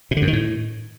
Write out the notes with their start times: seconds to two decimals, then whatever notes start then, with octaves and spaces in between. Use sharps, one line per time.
0.11 B2
0.17 D3
0.22 F#2
0.28 D#3
0.33 A2